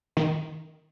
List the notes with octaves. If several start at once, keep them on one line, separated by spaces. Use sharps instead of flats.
D#3